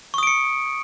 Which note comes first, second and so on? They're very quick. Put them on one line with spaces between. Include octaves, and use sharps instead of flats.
C#6 D#6 D7 C#7